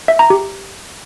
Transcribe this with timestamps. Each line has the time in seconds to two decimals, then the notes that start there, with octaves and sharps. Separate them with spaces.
0.08 E5
0.19 A#5
0.30 G4